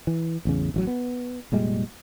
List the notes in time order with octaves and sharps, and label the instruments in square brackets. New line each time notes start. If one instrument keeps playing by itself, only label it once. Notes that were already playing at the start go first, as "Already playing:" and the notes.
[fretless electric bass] E3
A1 E2 C#3
A1 F3 F#3
B3
F1 A#2 G3 G#3